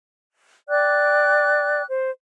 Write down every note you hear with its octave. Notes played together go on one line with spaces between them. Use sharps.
D5 G5 D6 F#6
C5